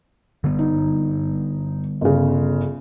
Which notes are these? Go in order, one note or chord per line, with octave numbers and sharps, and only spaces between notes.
D3 G3 B3
D#4
G1 C#3